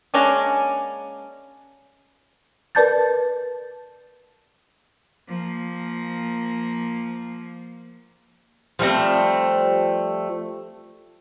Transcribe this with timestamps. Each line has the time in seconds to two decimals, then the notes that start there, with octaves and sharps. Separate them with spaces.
0.14 G#3 A#3 C#4 D4
2.75 A#4 B4 D5 A5 G6 A6
5.28 F3 A#3
8.79 F3 G3 A3 C4